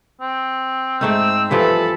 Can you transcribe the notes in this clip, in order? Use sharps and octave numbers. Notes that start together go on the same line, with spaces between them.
C4
G#2 A3 D#4 E6
G2 E3 F3 A4 B5